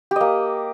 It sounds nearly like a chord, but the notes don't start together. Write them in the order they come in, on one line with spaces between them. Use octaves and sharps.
G4 D#5 A#3